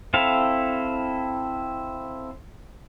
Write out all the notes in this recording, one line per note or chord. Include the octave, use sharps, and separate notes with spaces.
C4 E4 A4 F5